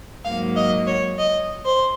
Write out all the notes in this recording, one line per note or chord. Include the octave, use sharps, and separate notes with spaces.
G#2 F#3 A#3 F5
D#5
C#5
D#5
C5